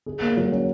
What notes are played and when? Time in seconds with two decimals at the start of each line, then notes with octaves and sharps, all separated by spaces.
0.06 G#4
0.22 A#3
0.37 F#3
0.52 C#4